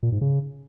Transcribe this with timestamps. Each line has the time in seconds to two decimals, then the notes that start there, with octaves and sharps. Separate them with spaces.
0.03 A#2
0.12 G#2
0.21 C#3